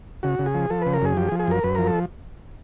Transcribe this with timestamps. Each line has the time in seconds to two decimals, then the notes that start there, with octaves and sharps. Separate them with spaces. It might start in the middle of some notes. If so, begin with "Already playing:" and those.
0.23 C#3 F#4
0.39 C#3
0.46 G#4
0.55 F3
0.70 F3 A4
0.82 C#3 B4
0.93 A#4
1.02 F#2 G#4
1.17 F3 G4
1.28 G#4
1.32 F3
1.39 G#4
1.48 F#2 A#4
1.64 F#2 B4
1.75 F3 A#4
1.87 A4